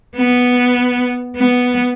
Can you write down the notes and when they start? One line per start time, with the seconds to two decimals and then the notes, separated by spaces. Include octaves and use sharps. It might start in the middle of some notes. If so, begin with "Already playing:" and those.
0.17 B3
1.37 B3